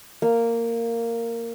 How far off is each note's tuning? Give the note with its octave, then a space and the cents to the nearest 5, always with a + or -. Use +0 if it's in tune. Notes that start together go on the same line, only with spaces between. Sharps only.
A#3 -10